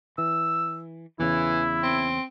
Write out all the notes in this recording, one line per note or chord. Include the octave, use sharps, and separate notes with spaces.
E3 E6
E2 C#3 E3 E4
C4